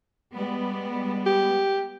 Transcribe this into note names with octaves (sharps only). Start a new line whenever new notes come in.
G3 G#3 B3
G4